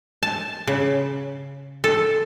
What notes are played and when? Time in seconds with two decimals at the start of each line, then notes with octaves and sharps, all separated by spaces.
0.23 A5
0.67 C#3
1.84 A4